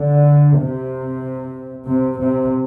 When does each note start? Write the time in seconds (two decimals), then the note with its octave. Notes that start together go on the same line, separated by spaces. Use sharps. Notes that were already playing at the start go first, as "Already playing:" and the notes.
Already playing: D3
0.58 C3
1.87 C3
2.20 C3